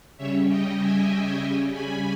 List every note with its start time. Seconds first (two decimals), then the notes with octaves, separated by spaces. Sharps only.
0.18 C#3 G3 C#4 C#5 E5
0.49 D#5 G5
0.80 E5 G#5
1.42 C#3 G3 C#4
1.73 G#5 B5